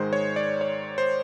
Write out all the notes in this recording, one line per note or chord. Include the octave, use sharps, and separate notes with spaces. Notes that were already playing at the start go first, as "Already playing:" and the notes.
Already playing: G#2 D#3 G#3 C5
C#5
D5
C#5
C5